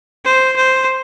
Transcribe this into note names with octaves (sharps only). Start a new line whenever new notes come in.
C5
C5